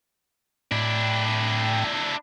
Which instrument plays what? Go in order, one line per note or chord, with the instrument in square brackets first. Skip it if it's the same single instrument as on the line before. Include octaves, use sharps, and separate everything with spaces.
[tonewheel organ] A2 G5 [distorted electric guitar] D4 E4